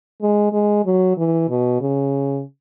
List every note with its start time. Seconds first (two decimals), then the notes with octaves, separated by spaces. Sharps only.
0.22 G#3
0.52 G#3
0.86 F#3
1.17 E3
1.49 B2
1.81 C#3